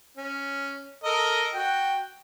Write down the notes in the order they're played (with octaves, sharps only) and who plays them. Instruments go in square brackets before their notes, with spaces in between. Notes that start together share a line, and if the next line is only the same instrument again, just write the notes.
[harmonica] C#4
A4 A#4 D#5
F#4 G5